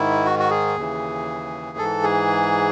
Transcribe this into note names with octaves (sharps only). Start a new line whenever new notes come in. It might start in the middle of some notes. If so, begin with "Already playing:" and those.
Already playing: G#2 D#3 E4
F#4
F#4
G#4
D#2 C#3 E3
G#2 E3 A4
G#4